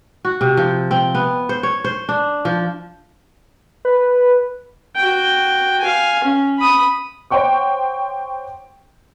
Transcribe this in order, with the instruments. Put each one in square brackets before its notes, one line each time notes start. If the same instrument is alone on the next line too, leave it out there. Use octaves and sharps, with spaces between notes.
[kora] F#4
C3
F3
C4
B3
C5
C#5
C5
D4
F3
[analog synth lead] B4
[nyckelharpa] F#4 G5
F5 G#5
C#4
B5 D#6
[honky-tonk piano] C5 C#5 F#5 G5 C#6 D6